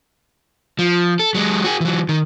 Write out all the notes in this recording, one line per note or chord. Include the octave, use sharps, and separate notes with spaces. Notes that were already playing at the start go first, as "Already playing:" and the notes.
F3
A4
F#3 G#3
F#4 G#4
E3 F#3
D#3